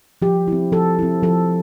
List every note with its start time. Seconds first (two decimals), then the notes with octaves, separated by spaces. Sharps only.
0.22 F3 G4
0.48 C4 E4
0.72 F3 A4
0.99 C4 E4
1.23 F3 A4